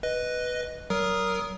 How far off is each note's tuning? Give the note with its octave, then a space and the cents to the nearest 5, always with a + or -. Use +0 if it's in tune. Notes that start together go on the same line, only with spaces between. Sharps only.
B4 +0 D#5 +0
F#3 +35 A#4 +0 D#6 +0